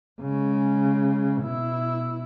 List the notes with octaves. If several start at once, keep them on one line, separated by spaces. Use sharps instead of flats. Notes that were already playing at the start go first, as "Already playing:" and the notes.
C#3 G#3
B2 E4